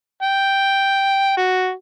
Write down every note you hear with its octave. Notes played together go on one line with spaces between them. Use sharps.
G5
F#4